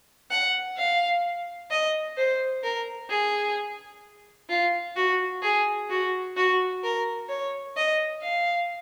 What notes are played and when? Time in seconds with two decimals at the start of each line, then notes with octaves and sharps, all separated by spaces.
0.31 F#5
0.77 F5
1.71 D#5
2.18 C5
2.63 A#4
3.10 G#4
4.50 F4
4.96 F#4
5.43 G#4
5.90 F#4
6.37 F#4
6.84 A#4
7.29 C#5
7.77 D#5
8.22 F5